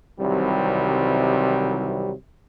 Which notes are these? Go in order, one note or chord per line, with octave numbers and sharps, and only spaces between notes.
C2 C3 D#3 E3 F#3 G3